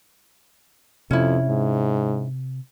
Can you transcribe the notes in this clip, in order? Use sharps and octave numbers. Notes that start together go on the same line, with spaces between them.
F2 C3 C#4 E4
G#2